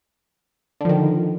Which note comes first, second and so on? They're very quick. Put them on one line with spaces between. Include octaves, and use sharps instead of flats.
D3 F3 D#3